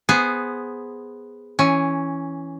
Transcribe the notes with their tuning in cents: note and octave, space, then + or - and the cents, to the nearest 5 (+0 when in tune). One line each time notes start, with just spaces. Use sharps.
B3 +0 G#4 +0 C5 +0
E3 +0 C#4 +0